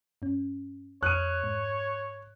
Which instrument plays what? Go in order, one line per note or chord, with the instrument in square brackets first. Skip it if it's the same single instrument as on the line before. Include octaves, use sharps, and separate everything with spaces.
[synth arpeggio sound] G2 C#4
[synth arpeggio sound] F2 D#6 F6 [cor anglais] C#5 [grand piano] F#6 D#7
[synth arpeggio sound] G#2